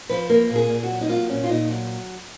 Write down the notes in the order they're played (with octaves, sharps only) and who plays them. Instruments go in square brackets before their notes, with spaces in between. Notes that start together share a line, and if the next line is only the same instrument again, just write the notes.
[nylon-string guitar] F3 B4
A#3 A#4
A#2
G#4
A#2
F#4
F#3
D#4
A#3 F4
A#2 C#4
F4
A#2 D#4
F#3